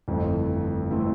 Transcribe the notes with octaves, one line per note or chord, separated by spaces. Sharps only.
G1 F2 E3 A3 C4
E3 A3 C4